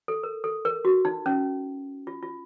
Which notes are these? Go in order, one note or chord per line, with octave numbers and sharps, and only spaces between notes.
A4
A#4
A4
A#4
F#4
D#4
C#4
F4
F4